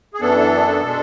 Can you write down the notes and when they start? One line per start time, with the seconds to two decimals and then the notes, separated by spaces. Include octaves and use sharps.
0.14 G#4
0.21 F#2 E3 B3 D4 A4
0.83 B2 G#3 D4